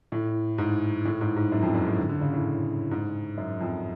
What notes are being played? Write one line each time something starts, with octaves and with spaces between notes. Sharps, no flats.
A2
G#2
A2
G#2
G#2
F#2
F2
F#2
G#2
D3
D3
C#3
A2
G#2
F#2
F2